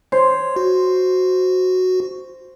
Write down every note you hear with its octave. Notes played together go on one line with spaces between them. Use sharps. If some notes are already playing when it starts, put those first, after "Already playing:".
C5 C#5
F#4